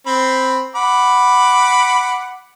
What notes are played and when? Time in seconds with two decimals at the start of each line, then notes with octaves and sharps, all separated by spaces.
0.06 C4 B5
0.75 F#5 B5 D6